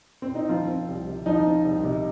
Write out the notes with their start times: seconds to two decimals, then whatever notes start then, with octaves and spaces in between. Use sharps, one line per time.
0.22 C4
0.35 D#4
0.49 F3 C4 F4
0.68 C4
0.89 C2
1.07 C3
1.26 F3 D#4
1.46 C4
1.65 C2
1.84 C3